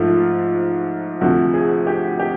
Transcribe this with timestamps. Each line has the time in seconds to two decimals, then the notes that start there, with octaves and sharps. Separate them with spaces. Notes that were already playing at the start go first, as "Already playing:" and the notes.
Already playing: G#2 F3 A3 F4
1.21 D2 C3 F3 A3 F#4
1.54 G#4
1.87 G4
2.20 G4